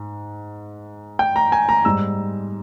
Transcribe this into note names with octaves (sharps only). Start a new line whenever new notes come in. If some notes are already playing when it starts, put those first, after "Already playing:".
Already playing: G#2
G5
A#5
G#5
A#5
G#2 G3 E6